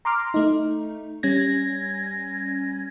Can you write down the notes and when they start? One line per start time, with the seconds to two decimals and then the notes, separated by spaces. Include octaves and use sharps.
0.05 A#5 C6 D6 F6
0.34 A3 D#4
1.23 G3 C#4 G#6 A#6